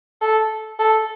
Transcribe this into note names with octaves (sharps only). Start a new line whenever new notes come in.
A4
A4